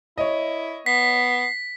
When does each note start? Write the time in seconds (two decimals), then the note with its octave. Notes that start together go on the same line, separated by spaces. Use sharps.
0.18 E4 C#5 D#5
0.86 B3 B6 C7